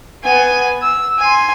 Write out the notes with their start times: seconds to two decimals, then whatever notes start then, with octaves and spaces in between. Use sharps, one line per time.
0.24 B3 G#5
0.83 E6
1.18 G#5 C6